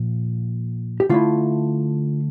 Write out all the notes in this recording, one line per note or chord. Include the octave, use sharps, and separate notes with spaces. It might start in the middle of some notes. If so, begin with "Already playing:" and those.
Already playing: A#2 F3
G4
D3 A3 E4 F4